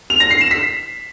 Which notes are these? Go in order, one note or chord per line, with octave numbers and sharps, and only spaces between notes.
F7
A#6
C7
E7
B6